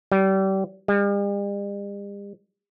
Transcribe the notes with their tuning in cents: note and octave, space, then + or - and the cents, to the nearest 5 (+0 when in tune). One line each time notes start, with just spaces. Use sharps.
G3 -30
G3 +45